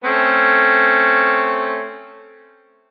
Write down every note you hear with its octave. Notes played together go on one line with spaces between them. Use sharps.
A3 C4 C#4